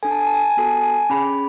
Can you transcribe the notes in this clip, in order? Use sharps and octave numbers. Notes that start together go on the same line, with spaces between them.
D4 A4 G#5
A5
G#5
A5
G#5
A5
G#5
B3 F#4 A4 A5
G#5
A5
G#5
C#4 G#4 B5